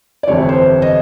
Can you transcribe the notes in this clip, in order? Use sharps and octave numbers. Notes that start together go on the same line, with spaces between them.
D5
G1 F2 C3 E3 C#5
C5
D#5